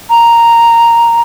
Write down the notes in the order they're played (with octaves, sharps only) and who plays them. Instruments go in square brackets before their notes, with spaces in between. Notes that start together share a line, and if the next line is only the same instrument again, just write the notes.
[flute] A#5